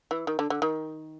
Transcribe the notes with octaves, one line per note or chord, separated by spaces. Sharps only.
E3
D#3
D3
D3
D#3